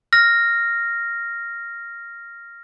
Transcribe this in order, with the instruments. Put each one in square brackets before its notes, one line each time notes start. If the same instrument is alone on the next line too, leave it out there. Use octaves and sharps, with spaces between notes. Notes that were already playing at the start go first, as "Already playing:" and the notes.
[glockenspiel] F6 A#6